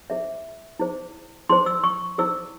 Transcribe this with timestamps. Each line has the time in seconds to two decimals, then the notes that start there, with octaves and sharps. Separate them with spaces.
0.10 E4 G#4 C5 E5
0.79 E4 G#4 C5
1.50 E4 G#4 C5 C6
1.66 E6
1.84 C#6
2.18 E4 G#4 C5 E6